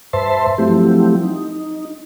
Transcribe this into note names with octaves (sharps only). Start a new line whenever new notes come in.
G2 B4 C5 E5 A5 C6
F3 F#3 A3 C4 E4 G4
D#4